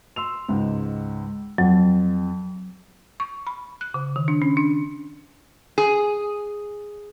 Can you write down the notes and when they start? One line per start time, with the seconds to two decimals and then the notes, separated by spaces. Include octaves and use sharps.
0.16 C6 E6 F7
0.49 C#2 G#2
1.58 F2 F#3
3.20 C#6
3.47 B5
3.81 F#6
3.94 C#3
4.16 D#3
4.28 D4
4.42 C#4
4.57 D4
5.78 G#4